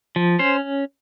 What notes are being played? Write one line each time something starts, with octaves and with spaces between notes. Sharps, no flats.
F3
C#4 C5